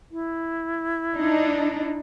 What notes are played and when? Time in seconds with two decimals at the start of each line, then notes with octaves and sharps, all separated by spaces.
0.11 E4
1.16 D4 D#4